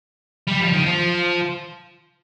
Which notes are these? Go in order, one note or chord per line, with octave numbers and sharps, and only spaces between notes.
G3
F3
D#3
F3